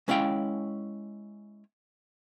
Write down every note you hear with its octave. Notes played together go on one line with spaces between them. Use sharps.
G#3 C#4 E4 F5 G5